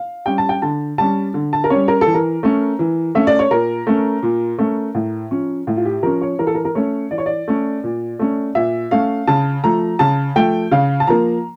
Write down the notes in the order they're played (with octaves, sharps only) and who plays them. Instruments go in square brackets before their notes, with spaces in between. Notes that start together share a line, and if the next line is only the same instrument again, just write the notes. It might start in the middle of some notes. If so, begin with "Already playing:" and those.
Already playing: [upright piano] F5
G3 C#4 G5
A5
G5
D3 A5
G3 C#4 A5
D3
A5
A#4
G3 C#4 C#5
A#4
A4
E3
A#4
A3 C#4
E3
A3 C#4 E5
D5
C#5
A#2 A#4
A3 C#4
A#2
A3 C#4
A2
F3 C#4
A2
F4
G4
F3 C#4 A#4
C#5
E3 A#4
A4
A#4
A#4
A3 C#4 C#5
E3 D5
C#5
D5
A3 C#4
A#2
A3 C#4
A#2 E5
A3 C#4 F5
C#3 A5
F3 A3 A#5
C#3 A5
F3 A3 G5
C#3 F5
A5
F3 A#3 A#5